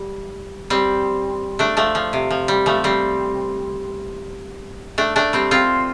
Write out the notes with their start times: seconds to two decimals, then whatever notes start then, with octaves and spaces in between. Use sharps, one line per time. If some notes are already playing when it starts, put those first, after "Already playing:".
Already playing: G3
0.70 G3 C4
1.59 A3 D4
1.77 F3 A3
1.95 F3
2.13 C3
2.31 F3
2.48 G3
2.66 F3 A3
2.84 G3 C4
4.98 A3 D4
5.16 A3 D4
5.33 G3 C4
5.51 C4 F4